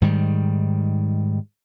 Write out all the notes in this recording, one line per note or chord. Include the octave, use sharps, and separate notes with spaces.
G#2 D#3 G3